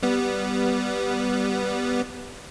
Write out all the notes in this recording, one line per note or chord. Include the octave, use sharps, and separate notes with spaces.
G3 B3